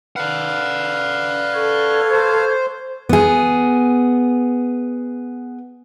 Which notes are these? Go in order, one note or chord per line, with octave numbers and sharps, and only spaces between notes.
B4 D5 F5 F#5 F6
A4 C#6 G#6
C5
B3 G#4